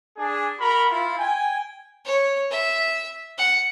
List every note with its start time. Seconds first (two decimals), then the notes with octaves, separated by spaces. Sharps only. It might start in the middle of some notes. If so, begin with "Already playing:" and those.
0.16 D4 G#4
0.59 F#4 A#4 B5
0.89 E4 F4
1.18 G5 G#5
2.05 C#5
2.51 E5
3.38 F#5